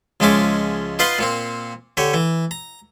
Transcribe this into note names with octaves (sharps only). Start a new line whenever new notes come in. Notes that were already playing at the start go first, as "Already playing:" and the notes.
C#2 F3 G#3 C#4 E5 D6
D#4 F4 B4 F5 F#5 C6
A#2 A#3 C4
D3 G4 C#5
E3
A#5